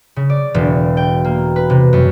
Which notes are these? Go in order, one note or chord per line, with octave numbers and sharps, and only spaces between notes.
C#3
D5
E1
G5
A#3
B4
C3
F#2